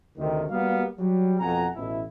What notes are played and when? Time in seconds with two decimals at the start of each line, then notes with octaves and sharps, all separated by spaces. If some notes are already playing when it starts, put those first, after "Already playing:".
0.18 D2 C3 D#3
0.49 G3 A#3 B3 F#4 F5
0.98 F#3 G3
1.39 F2 B2 F#5 G#5 A#5
1.75 A1 B2 E4